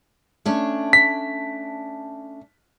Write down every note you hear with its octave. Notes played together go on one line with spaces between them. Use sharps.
A3 C#4 D4
B6